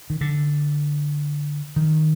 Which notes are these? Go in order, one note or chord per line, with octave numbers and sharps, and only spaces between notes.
D#3
D3
D#3